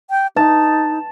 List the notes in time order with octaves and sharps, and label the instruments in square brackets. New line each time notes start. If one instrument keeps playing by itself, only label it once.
[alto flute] G5
[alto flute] D#4 [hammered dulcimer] A5